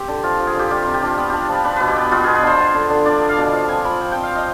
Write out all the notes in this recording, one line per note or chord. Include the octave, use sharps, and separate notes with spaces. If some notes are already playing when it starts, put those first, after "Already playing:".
Already playing: C4 G4
D3
F3 F4
F3
G#4
D3 G4
G3 F4
C3 F4
G4
D4 F4
B3
D4 G4
F3 B4
D4 B4
B2 B4
G4
B3
B3 F4
B2 G#4
B4
D4 C5
B3
D3
D3
D4 D5
B3
F5
B2
F3 F5
C4 G#5
F3 B5
C4 G5
C4 G5
F5
C4 D#5